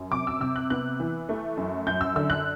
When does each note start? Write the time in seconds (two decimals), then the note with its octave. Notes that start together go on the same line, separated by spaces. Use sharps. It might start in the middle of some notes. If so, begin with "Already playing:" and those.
Already playing: F#2
0.11 C3 D6
0.27 E6
0.40 C3 E6
0.56 F#6
0.70 B3 F#6
1.00 E3
1.29 A3
1.57 F#2
1.86 F#2 G6
2.01 E6
2.16 D3 E6
2.30 F#6